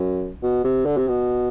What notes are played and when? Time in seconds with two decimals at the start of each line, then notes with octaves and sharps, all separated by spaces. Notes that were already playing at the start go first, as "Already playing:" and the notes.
Already playing: F#2
0.43 B2
0.64 C3
0.85 D3
0.97 C3
1.08 B2